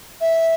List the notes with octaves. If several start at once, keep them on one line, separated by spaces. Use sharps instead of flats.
E5